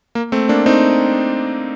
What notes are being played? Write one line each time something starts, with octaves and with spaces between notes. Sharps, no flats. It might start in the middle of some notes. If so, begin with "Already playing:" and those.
A#3
A3 C4
A#3 D4
C4 D#4